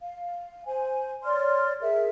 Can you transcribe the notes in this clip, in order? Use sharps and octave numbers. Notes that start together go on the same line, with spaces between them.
F5
C5 G#5
C#5 D5 C6 F6
G#4 A#4 E5